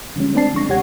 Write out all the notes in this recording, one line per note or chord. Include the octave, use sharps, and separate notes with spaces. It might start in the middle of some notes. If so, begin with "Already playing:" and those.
D3 F3 G3 G#3 C#4
A3 C4 D4 D5 A5 C7
C2 F3 G#3 C#6 A#6
D#2 C3 G4 C#5 F#5 G#6